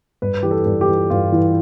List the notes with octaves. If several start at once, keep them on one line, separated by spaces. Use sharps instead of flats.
G2 B4
E3 G4
A4
G2
G4
E3
G2 F4
E3